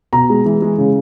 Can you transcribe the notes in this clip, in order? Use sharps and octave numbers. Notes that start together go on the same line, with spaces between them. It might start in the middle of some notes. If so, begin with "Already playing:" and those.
B2 A#5
G#3
E3
G#3
C#3